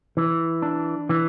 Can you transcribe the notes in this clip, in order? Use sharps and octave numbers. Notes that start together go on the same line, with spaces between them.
E3
D4
E3